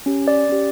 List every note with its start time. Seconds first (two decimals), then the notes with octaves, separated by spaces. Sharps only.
0.06 C#4 G4
0.28 D5
0.49 C#4 G4